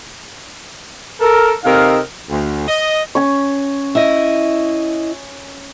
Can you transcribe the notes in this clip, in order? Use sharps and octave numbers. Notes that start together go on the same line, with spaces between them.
A4 A#4
C3 D#4 A4 A#4 D#5 F5
D2
D#5
C#4 C#6
E4 D#5